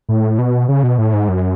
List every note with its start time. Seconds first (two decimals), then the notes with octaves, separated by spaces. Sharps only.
0.09 A2
0.38 B2
0.68 C#3
0.83 B2
0.98 A2
1.13 G#2
1.29 F#2